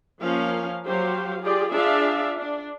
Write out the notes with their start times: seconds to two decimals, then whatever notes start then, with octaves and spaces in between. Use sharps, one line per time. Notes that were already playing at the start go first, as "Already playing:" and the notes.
0.22 F3 A#3 C#4 A#4 F5
0.85 F#3 F#4 G4 C5 F5
1.42 F4 G4 G#4 D5
1.72 D4 F4 G#4 D5 E5 F5
2.37 D4